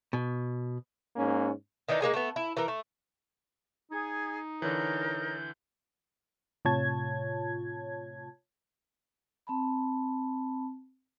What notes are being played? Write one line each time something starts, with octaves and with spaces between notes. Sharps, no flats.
B2
G#2 A#3 C#4
D#3 E3 D4 D#4
G#3 A#3 G#4 G#5
A3 B3
E4
E3 A#4
A3
D#4 G#4 G#6
D3 E3 A#4 C#5 G6
A2 C3 F4 C#5 A5 G#6
C4 A5 B5